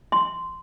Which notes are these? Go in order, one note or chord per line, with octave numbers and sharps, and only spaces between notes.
C6